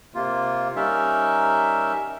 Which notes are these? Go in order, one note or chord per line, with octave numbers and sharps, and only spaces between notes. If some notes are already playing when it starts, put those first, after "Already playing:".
C3 A#3 F4
G3 C#4 D#4 A#4 E5